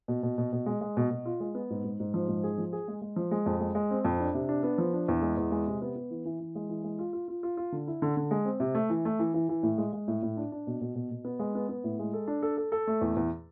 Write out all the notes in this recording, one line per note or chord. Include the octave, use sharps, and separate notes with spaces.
B2
B2
B2
B2
G#3
G#3
B2
B2
F4
G#3
B3
G#2
G#2
G#2
F3
G#2
G#4
F3
G#4
G#3
G#3
F3
G#3
F2
G#3
G#3
C4
F2
D4
C3
D4
B3
F3
D4
E2
G#3
E2
G#3
C3
B3
B3
E3
E3
E3
G#3
E3
G#3
F4
F4
F4
F4
F4
D3
E4
D3
D3
G#3
C4
C3
A3
E3
A3
E3
E3
E3
A2
G#3
G#3
A2
A2
D4
D4
B2
B2
B2
B2
B3
G#3
B3
B3
A2
G#3
A4
D4
A4
A4
A4
A3
E2
E2